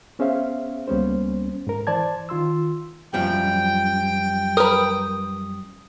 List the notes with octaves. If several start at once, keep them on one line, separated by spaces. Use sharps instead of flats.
B3 C#4 G#4 C5 E5 F5
C#2 G3 A#3 B3 C#4 C5
G#2 A#4
E3 C5 D5 A5 G#6
D#3 F4 C6 E6
F#2 F3 G3 G5
A#4 B4 D#6